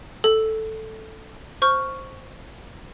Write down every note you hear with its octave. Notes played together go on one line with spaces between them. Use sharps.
A4
C5 C#6 F6